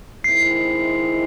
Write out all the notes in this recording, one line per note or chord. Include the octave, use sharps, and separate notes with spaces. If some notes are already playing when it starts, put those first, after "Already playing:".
D#3 G#3 C4 E4 C7